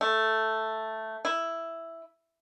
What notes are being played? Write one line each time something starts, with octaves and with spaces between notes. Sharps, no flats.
A3
E4